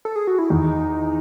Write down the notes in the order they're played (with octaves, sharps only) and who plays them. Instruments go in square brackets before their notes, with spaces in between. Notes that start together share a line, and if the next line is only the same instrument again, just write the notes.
[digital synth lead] A4
G#4
F#4
E4
[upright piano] E2 [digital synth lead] D#4